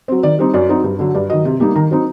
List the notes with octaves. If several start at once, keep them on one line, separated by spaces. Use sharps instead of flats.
F#3 C4
D#3 D5
G3 C4 D#4
F#2 D5
F#3 C4 D#4
G2
D3 F#3
G2 D5
D#3 F#3 D#5
C3
G3 A#3 D#4
D#3 A#5
F#3 C4 D#4